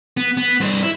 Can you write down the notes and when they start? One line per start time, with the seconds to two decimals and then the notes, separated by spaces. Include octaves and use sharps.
0.17 B3
0.37 B3
0.60 G2 C5
0.83 E4